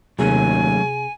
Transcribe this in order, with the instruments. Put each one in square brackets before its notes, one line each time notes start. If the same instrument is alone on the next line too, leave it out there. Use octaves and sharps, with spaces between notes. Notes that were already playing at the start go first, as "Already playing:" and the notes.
[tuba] D#2 [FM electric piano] C3 G#4 [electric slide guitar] F#3 A3 C#4 [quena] G#5